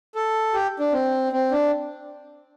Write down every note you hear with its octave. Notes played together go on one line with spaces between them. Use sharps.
A4
G4
D4
C4
C4
D4